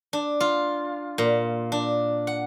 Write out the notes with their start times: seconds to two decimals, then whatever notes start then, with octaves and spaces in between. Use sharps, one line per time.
0.13 D4
0.40 F4
1.18 A#2
1.72 D4
2.27 F#5